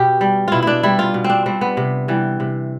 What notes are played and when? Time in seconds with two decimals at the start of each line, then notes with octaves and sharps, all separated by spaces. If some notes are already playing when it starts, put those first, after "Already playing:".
Already playing: B2 G4
0.21 G3
0.48 B2 E4 F4
0.63 D4 E4
0.83 G3 E4
0.99 F4
1.14 B2
1.24 C4
1.30 D4
1.46 G3 C4
1.61 B3
1.77 C3
2.08 E3 G3
2.40 C3